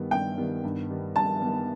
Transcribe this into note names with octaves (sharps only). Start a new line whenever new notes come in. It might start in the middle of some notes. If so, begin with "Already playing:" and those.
Already playing: G2 D#3 G3 B3
G2 G5
D#3 G3 B3
G2
D#3 G3 B3
G2 A5
D#3 G3 B3